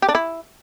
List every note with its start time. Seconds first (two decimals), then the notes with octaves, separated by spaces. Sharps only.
0.02 G4
0.08 D4
0.15 E4